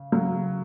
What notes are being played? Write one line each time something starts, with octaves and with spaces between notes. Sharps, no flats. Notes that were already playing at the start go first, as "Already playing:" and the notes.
Already playing: C#3
C#3 F#3